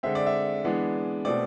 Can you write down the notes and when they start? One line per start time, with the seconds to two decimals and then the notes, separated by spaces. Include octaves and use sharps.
0.03 D3 G#3 C4 E5
0.15 D5
0.26 E5
0.64 E3 G#3 B3 D4
1.25 B2 A3 C4 D5